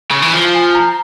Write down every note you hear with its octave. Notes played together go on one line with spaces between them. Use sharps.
C#3
E3
F3
G#5
A#5